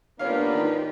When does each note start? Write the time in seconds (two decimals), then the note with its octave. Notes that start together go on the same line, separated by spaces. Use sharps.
0.19 A#3 B3 C#4 D4 F4 G4 B4 F5
0.55 D#3